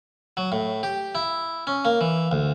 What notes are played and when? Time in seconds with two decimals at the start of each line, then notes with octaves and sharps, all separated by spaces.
0.37 F#3
0.52 A2
0.83 G4
1.15 E4
1.67 C#4
1.85 A#3
2.01 E3
2.31 D2